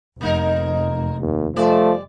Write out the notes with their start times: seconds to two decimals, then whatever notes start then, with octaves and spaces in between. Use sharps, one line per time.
0.21 F1 A#3 D#4 A#4
1.20 D#2
1.56 F3 G3 A3 D5